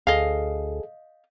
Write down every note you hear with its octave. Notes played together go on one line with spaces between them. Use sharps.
D2 G#4 A4 D#5 F5